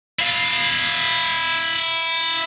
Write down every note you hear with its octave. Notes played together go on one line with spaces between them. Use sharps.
E4 F5